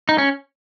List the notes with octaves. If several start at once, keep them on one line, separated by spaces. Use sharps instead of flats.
D#4
C#4